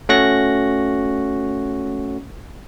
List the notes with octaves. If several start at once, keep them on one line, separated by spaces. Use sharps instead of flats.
A3 C#4 F#4 C#6 F#6 A#6